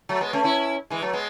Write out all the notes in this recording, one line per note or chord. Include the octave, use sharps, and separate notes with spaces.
F#3 A3
G#3 B3
A3 C#4
C#4 E4
E3 G#3
F#3 A3
G#3 B3